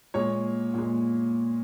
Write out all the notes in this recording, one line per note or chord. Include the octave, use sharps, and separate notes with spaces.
A#2 G#3 C#5
A#2 G#3